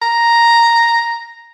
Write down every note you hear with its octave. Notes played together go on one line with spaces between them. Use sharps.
A#5